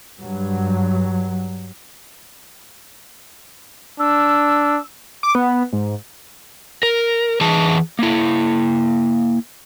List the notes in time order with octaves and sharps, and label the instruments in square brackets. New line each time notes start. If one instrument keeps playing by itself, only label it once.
[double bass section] G2 F#3
[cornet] D4 [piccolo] E6
[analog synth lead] D6
B3
G#2
[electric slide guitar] A#4
E3 G#4 A5
A#3 E4